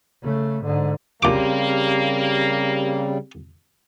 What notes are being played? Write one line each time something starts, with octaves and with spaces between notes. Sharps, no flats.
C#3 A3
G#2 D3
A#1 C#3 G3 A#3 C4 G4 D6